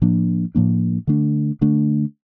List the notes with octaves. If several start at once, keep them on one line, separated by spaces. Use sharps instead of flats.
A2 F3 A#3 D4
A2 F3 A#3 D4
D3 A3 D4
D3 A3 D4